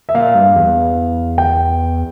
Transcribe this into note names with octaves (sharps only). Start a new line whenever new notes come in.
E5
A#2 F5
G2
E2
G5